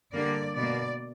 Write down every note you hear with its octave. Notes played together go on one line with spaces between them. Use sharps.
D3 G3 A#3 D5
B2 A#3 D5